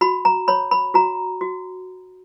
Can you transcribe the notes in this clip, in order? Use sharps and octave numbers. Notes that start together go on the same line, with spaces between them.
F#4 B5
A#5
C#5 B5
B5
F#4 A#5
F#4